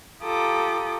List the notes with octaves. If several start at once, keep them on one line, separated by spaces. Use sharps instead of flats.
F4 G4 A4 A#5 D6 D#6